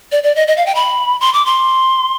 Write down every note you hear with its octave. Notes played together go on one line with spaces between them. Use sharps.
D5
D5
D#5
D#5
F5
G5
B5
C6
D6
C6